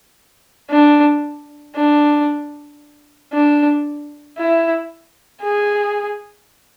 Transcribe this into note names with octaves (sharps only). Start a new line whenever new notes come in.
D4
D4
D4
E4
G#4